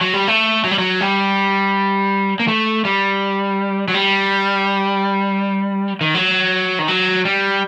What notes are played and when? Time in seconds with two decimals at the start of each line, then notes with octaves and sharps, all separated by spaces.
0.01 F#3
0.14 G3
0.28 A3
0.64 F#3
0.71 G3
0.79 F#3
1.01 G3
2.40 A#3
2.48 A3
2.85 G3
3.88 F#3
3.94 G3
6.01 D#3
6.14 F#3
6.79 D#3
6.88 F#3
7.25 G3